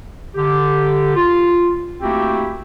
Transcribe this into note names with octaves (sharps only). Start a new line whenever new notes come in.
D3 G4
F4
A3 A#3 C4 E4 F#4 G4